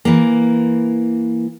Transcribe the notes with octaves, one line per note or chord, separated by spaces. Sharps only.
E3 A#3